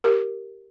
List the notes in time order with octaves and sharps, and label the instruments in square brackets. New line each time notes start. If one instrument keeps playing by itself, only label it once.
[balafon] G4 A#4